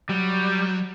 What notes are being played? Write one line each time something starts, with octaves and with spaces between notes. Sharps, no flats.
F#3 G3